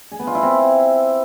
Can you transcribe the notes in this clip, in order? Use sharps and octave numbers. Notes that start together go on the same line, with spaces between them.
G#4
B3
F4
E4
C4